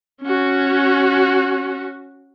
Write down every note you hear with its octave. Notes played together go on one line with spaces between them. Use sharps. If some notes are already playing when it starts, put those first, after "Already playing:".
C#4 F#4